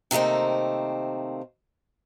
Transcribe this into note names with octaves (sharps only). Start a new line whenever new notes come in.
C3 D#3 A3 A#3 C4